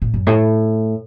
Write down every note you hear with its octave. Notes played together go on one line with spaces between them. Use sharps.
A2
F#2
A2